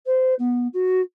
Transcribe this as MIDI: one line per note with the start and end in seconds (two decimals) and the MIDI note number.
0.06 0.34 72
0.39 0.67 59
0.73 1.00 66